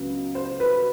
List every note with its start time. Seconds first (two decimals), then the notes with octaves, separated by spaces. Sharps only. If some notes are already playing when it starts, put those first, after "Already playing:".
Already playing: C#2 C#3 F#3 B3
0.35 C5
0.60 B4